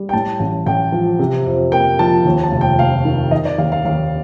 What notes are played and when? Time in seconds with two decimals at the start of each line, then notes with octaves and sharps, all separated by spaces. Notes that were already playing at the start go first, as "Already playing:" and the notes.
Already playing: G3
0.09 G5
0.13 A2 A5
0.40 A1
0.66 A1 G5
0.92 F3
1.19 C3
1.46 F2
1.72 A#3 G5
1.99 F3 A5
2.25 D#2
2.43 A5
2.52 F1
2.61 G5
2.79 F1 F5
3.05 D#3
3.31 D#3 D#5
3.45 D5
3.58 D#2 F5
3.72 F5
3.85 D#2 F5